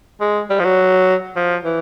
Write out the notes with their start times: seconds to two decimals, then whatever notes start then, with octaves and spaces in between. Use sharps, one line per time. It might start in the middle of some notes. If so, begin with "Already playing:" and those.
0.21 G#3
0.50 G3
0.60 F3
0.64 F#3
1.36 F3
1.65 E3